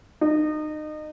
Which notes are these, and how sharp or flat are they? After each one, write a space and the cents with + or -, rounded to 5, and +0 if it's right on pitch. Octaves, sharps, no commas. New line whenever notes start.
D#4 -30